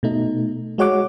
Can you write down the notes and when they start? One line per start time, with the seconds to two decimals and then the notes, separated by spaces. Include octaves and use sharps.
0.03 B2 A3 D#4
0.78 G#3 F#4 C#5 F#5 D6